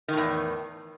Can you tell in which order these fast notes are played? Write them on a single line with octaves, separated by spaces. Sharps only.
D#3 A2 E2